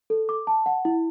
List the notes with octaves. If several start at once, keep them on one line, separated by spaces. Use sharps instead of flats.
A4
D6
A5
F#5
E4